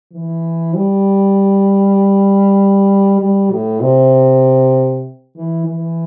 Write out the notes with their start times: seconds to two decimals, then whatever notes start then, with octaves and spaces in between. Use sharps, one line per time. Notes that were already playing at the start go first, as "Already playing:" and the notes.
0.13 E3
0.74 G3
3.21 G3
3.51 A2
3.82 C3
5.36 E3
5.66 E3